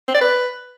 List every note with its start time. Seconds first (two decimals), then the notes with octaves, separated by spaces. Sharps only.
0.08 C4
0.15 D5
0.21 B4